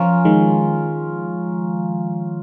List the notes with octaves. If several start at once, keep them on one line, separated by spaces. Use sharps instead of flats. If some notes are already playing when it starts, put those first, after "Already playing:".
Already playing: F3 C#4 F4 A#4
D#3 G#3